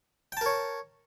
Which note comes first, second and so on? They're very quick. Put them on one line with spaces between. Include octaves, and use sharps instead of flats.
G5 A5 A#4 C#5